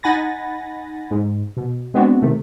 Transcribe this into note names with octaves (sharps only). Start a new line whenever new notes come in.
D#4 F#5 G#5 B5 A6 A#6
G#2
B2
G#3 B3 C4 D4 F#4
C3 D#3 A3